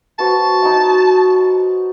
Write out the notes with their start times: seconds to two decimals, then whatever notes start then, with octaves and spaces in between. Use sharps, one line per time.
0.19 B3 F#4 C5 A5
0.62 D#4 F#4 F#5